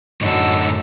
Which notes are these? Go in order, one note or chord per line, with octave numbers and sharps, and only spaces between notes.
F#2 A2 D3 D4 D#4 E6